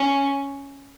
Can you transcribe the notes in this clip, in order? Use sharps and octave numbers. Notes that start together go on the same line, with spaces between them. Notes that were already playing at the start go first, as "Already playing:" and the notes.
Already playing: C#4